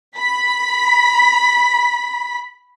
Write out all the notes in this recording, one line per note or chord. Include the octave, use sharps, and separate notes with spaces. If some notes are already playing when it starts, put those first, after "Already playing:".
B5 B6